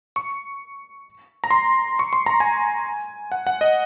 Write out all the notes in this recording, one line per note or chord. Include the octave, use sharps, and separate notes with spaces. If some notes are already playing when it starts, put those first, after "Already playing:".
C#6
A#5
C6
C#6
C6
A#5
G#5
F#5
F#5
D#5